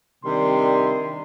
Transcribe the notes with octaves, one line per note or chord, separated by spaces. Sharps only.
C3 D#3 G3 D4 C6